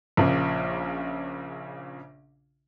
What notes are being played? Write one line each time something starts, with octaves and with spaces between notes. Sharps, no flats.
A#1 A#2 C#3